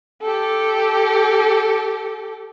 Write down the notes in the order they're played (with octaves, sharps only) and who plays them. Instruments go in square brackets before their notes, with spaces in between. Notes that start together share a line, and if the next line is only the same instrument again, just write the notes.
[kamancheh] G4 A4